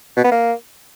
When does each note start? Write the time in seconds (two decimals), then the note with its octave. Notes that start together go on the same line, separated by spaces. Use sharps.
0.17 B2
0.24 B3
0.32 A#3